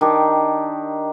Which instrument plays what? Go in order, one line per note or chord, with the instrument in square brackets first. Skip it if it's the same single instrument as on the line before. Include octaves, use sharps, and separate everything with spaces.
[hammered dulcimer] D#3 D4 G4